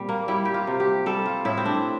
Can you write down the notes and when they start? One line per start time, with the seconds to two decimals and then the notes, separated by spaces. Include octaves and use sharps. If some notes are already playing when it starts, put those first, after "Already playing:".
Already playing: A#2 G3 C4
0.09 A#3
0.28 G3 E4
0.45 G4
0.54 F4
0.67 C3
0.80 G4
1.06 G3 A4
1.26 F4
1.45 A2 E4
1.57 C4
1.65 D4